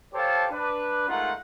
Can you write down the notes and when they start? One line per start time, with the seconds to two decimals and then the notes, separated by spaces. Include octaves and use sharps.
0.14 G4 A4 C5 C#5 F5 A5
0.50 D4 B4
1.08 G#3 A3 D#4 F4 A#4 F#5